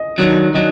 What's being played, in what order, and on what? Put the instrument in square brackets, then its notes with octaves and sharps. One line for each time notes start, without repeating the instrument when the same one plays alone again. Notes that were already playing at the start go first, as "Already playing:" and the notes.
Already playing: [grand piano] D#5
[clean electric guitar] D#3 F#3 D4
[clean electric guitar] D#3 F#3 D4 [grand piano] D#5